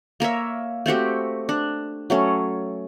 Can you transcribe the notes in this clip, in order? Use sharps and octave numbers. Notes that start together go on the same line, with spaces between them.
A#3 A#4 C#5 E5
A3 C4 F#4 G4
D4
F#3 A3 C#4